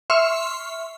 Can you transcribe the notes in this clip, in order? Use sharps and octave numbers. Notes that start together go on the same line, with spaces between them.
E5 C6 C#6 F6